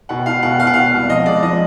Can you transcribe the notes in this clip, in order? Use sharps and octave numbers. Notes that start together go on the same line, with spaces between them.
B2 F#5
B2 F5
B2 F#5
B2 F5
F#5
B2 F5
C2
F3 D#5
G#3 D5
F3 D#5